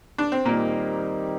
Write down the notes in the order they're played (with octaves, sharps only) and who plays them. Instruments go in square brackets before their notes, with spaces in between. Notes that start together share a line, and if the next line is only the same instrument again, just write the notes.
[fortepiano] D4
C4
[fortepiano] A#2 A#3 [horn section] D#3 G3 C4 D#4